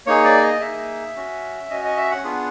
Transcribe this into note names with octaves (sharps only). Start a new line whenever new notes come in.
A#3 D#4 G#4 C#5
D5
D#5
A#3 D#4 G#4 E5
C#4 F#4
C#4 F#4 D#5
D#5
E5
F#5
B3 D4 F4 G#4